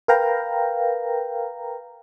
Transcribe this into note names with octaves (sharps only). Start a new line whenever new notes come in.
A#4 B4 F5 G5 A#5